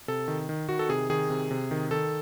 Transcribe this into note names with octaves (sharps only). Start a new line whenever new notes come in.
C3 A4
D#3
D#3
D#3 F#4
A4
C3 G#4
D#3 G#4
C3
C3
D#3
D#3 A4